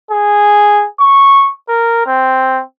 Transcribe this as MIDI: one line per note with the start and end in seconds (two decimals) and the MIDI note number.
0.11 0.85 68
1.00 1.52 85
1.68 2.03 70
2.06 2.62 60